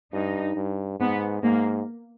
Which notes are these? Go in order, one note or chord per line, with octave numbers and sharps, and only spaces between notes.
G2 D#4
G2
G#2 B3
G#2 A#3